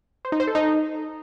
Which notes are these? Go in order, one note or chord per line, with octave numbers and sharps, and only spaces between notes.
C5
D#4
C5
A4
D#4